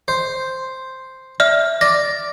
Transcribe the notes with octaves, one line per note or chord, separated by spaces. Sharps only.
C5
D5 E5 F6
D5 A#6